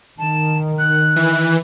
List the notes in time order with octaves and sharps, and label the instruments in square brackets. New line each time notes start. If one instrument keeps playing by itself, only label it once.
[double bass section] D#3 [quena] A5
[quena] F#6
[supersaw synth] E3